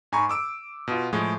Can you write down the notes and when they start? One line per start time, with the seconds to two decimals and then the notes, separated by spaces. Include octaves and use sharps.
0.12 G#2 G#5 A#5 B5 C#6
0.29 D6 E6 D7
0.88 B2 F4
1.13 A2 F3 G#3